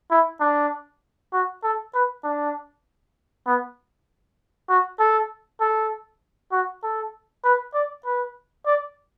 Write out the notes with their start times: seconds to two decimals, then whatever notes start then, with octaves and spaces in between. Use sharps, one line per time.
0.11 E4
0.40 D4
1.33 F#4
1.63 A4
1.94 B4
2.24 D4
3.47 B3
4.69 F#4
4.99 A4
5.60 A4
6.52 F#4
6.83 A4
7.44 B4
7.74 D5
8.05 B4
8.66 D5